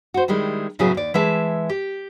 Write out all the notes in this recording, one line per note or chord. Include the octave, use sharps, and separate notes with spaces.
F#4 C5
D#3 G3 G#3 E4
A2 C#3 F#3 B3 E4 G#4
D#2 D5
E3 G#3 E5 A5
G4